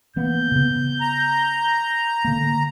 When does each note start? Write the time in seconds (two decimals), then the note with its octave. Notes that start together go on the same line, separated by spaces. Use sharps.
0.16 E3 A#3 B3 G6
0.52 C#3 B3
1.01 A#5
2.25 D3 A#3